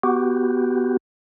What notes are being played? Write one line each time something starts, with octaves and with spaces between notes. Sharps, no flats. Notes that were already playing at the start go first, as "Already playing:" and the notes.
B3 F#4 G4